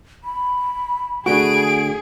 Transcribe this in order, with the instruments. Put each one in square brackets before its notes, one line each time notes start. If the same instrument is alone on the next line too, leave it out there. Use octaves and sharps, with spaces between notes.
[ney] B5
[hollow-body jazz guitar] D3 A3 F#4 [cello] G#4 [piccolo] D7